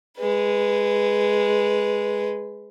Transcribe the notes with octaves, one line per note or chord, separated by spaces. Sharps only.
G#3 B4